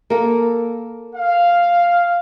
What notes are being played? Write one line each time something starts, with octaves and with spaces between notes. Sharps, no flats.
A#3 A4
F5